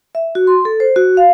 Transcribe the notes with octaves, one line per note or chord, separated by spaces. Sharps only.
E5
F#4
C6
A4
C5
F#4
F5